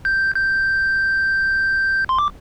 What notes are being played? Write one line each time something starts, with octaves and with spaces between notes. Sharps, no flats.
G6
G6
C6
D6